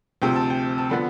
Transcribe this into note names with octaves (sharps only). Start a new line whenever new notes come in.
D2 C3 F3 G5
A5
G5
A5
D3 F3 B3 B5